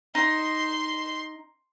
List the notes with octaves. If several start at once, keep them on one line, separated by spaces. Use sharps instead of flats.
D#4 C6